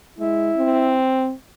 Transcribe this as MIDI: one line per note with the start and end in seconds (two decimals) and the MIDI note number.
0.18 0.51 56
0.18 1.00 64
0.56 1.33 60